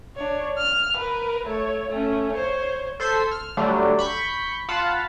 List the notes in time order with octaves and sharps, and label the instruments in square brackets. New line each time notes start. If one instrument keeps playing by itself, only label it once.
[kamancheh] D4 C#5
F6
A#4 B4
A3 C#5
A3 C#4
C5 C#5
[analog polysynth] A4 C5 G#6 B6 C7
F6
D3 F#3 G3 A3 D4
B5 C#6 G6
F4 F5 F#5 A5 B5